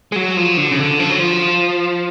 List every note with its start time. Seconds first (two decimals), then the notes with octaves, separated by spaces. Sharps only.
0.12 G#3
0.16 F#3
0.37 F3
0.57 D3
0.71 C#3
0.79 D3
0.99 F3
1.10 F#3
1.20 F3